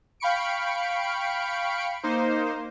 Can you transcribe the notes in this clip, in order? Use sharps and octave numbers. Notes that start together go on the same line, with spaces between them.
F5 G5 B5 C#6 C#7 D7
A#3 D#4 C5